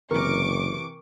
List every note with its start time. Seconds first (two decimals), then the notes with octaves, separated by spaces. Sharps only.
0.11 F#1 C3 E3 A#4 C#6 D6